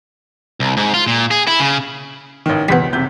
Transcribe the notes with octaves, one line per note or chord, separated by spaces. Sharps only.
C2
G#2
F4
A#2
G#4
E4
C#3
A1 D#3
C#2 G3 B3 B6
F#1 C3 G6